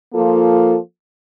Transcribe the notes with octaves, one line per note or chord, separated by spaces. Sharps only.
F3 A#3 F4 A4